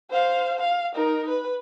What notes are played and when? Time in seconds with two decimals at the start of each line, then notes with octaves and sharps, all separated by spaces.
0.11 C5 F5
0.60 F5
0.95 D#4 A#4
1.28 B4